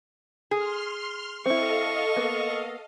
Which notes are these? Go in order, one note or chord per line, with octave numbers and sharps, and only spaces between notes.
G#4 C6 F6
C4 E4 A4 D#5 F5 C#6
A#3 B3